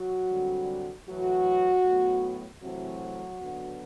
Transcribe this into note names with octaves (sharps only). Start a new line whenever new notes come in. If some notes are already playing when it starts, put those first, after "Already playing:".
Already playing: F#3 F#4
D3 G3 C4
A2 E3 F#3 A3 F#4
A2 F#3 B3
C3 E3 F#3 A3 C4 F#4
D3 F#3 B3